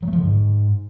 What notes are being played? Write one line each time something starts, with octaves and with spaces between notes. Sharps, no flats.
F#3
A3
F3
D3
G#2